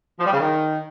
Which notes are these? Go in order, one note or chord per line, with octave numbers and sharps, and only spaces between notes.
F3
G3
C#3
D#3